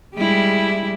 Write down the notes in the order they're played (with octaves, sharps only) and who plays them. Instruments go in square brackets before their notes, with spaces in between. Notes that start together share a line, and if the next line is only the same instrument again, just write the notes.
[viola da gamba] G3 G#3 E4